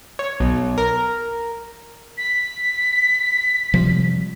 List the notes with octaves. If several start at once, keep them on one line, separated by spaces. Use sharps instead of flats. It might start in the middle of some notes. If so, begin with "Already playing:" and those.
C#5
B1
A#4
B6
C3 F3 G3